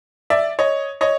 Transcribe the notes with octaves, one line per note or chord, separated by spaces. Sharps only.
D5 E5
C#5 D#5
C#5 D#5